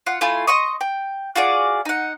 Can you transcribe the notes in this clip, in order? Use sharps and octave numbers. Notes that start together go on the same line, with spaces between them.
F4 F#5
A3 E4 F4 G#5
D#5 C6 C#6 D#6
G5
F4 F#4 G#4 D5
D#4 F#5